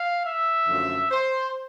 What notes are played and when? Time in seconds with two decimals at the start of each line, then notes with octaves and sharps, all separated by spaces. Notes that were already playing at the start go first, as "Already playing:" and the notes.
Already playing: F5
0.23 E5
0.67 F#2 D3 F3 A3
1.11 C5